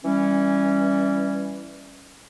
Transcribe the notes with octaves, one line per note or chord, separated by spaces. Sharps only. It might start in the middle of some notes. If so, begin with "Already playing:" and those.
E3 G3 C#4